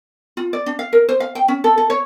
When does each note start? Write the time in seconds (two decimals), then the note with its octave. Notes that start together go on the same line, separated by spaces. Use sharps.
0.37 F4
0.53 D5
0.66 D4
0.79 F5
0.93 A#4
1.09 C5
1.20 F5
1.35 G5
1.48 C#4
1.64 A4
1.78 A4
1.90 C#5